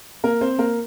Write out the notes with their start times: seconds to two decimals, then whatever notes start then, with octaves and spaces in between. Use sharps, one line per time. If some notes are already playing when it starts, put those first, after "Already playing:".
0.24 A#3 A#4
0.41 C4 C5
0.58 A#3 A#4